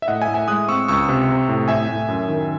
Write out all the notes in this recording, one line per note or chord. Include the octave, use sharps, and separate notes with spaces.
E5
A2 D#5 F#5
E5 G#5
A2
E5 G#5
G#3 D#6 F#6
C4 C#6 E6
C#2 C#6 E6
C3
C4
A2
A2 E5 G#5
A2
F#2
D#3